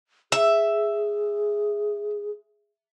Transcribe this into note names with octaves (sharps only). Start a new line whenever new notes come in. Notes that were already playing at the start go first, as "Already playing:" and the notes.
G#4 E5